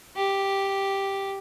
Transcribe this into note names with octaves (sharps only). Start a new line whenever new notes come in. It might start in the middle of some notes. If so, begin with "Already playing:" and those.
G4